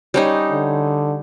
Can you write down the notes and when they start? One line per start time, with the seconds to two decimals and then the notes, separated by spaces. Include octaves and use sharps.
0.14 G3 C#4 D#4
0.51 D3